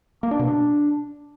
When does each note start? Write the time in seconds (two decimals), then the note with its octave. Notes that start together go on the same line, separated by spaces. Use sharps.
0.23 A#3
0.31 D4
0.39 B2
0.47 D4